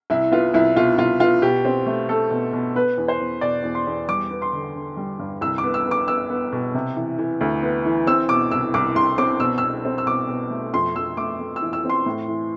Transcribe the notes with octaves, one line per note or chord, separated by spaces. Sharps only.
C2 E4
B3 F4
C2 E4
B2 F4
C2 F4
B3 F4
B2 G4
C4
A3
A3 A4
B2
B2
B3 B4
E2
C5
E2
B2 D5
E2
C6
E2
G3 D6
B3
C6
D3
D3
G3
G2
C2 E6
D6
B3
E6
B3
D6
B3 E6
B3
B2
C3
E3
E3
D2
B3
E3
C4 E6
B2 D6
C2 E6
C2 D6
C2 C6
C4 D6
B2 E6
B2 E6
C4
E6
B2 D6
B2
A3
F2 C6
F2 E6
A3 D6
A3
E6
E3
E6
C4
C6
A2
E3